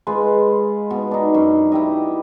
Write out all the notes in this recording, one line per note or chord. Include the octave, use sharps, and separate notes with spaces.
G#3 F4 B4
B2
D4 D#4
F#2
E4 G4 D#5